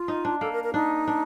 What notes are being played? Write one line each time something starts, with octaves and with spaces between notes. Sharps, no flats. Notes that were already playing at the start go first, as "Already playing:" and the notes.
Already playing: F4
D#4
D4
A#3 A4
A#4
A#4
D4 D#4
D4